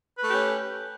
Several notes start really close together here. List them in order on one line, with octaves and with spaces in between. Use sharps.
B4 A3 G4 C#4